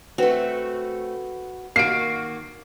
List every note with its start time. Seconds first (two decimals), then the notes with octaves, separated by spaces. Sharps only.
0.18 A3 C4 F#4 B4
1.76 D#3 A#3 F#4 C7 D7